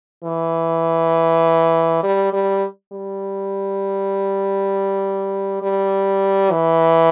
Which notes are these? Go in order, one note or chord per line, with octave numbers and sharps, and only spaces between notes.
E3
G3
G3
G3
G3
E3